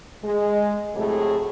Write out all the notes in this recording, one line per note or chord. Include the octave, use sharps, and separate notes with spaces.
G#3
A2 C3 F#3 A3 G#4 A4